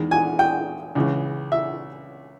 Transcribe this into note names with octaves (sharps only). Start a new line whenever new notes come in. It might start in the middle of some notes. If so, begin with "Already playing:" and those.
Already playing: E2 D#3 G#3 D#4
G#5
G5
C#2 C#3 E3
E5